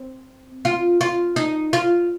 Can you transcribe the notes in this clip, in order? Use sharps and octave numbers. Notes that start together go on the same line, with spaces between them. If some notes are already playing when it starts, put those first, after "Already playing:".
Already playing: C4
F4
F4
D#4
F4